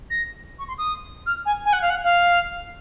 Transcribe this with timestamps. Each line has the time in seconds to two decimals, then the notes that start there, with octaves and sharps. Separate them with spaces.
0.10 A#6
0.58 C#6
0.68 C6
0.78 D#6
1.26 F6
1.45 G#5
1.65 G#5
1.73 F#5
1.81 F5
1.90 F#5
2.04 F5